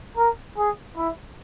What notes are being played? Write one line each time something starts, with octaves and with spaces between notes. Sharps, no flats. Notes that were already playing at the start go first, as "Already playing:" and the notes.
A#4
G#4
E4